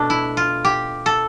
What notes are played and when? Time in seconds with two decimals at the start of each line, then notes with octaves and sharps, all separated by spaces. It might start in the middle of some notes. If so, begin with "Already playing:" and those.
Already playing: B2 A3 D4
0.10 E4
0.37 F4
0.65 G4
1.06 A4